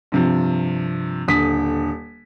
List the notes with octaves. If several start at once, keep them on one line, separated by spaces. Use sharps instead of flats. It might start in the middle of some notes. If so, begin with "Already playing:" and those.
G2 C3 F3
D#1 D3 D#6 B6